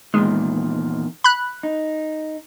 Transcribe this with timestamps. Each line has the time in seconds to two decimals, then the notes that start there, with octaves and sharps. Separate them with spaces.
0.14 E2 A#2 D#3 G#3
1.24 B5 F#6
1.63 D#4